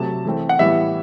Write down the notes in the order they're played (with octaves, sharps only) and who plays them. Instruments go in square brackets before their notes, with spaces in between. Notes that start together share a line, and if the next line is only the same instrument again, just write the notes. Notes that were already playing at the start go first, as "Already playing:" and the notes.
Already playing: [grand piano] C3 F#3 A3 A5
E3 A3 C4
F#5
A2 E3 G3 B3 E5